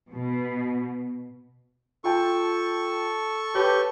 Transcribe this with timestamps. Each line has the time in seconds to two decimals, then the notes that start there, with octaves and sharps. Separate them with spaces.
0.13 B2
2.04 F4 A4 G5 C#6
3.55 G4 B4 C#5 A5